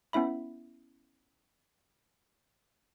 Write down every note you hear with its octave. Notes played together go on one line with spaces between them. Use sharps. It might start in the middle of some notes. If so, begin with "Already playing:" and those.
B3 C#4 E4 E5 B5